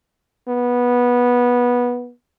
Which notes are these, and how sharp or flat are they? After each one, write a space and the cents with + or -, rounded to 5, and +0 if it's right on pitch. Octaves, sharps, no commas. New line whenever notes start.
B3 -15